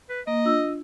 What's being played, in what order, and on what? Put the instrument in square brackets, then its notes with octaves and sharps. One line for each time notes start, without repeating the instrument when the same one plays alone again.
[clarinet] B4
[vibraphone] A#3 [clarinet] D#5
[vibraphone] D4 F4 E6